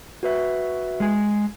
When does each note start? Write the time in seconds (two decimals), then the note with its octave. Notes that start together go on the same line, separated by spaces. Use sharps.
0.23 F#4 B4 E5
1.00 G#3 G#4